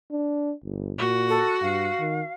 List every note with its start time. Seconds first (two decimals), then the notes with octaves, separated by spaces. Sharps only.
0.11 D4
0.64 G1
0.98 A#2 F#4
1.29 A4
1.61 G2 F5
2.00 D#3